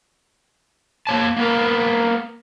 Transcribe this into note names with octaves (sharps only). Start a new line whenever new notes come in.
A#3 C#5 A5
A#3 B3 A#4